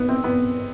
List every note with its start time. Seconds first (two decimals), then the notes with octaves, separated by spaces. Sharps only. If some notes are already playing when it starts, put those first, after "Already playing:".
Already playing: B3
0.09 C4
0.24 B3